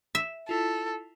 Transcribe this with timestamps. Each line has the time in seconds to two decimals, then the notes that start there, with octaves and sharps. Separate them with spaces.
0.15 E5
0.49 E4 F4 A4